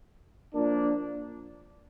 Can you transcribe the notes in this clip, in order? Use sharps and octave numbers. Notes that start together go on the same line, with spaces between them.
F3 A#3 D4